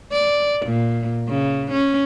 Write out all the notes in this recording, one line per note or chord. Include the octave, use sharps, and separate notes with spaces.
D5
A#2
C#3
C#4